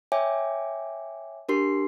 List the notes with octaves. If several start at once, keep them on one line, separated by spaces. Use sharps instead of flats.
C#5 E5 G5 G#5 D6
D4 G4 A#4 C6 C7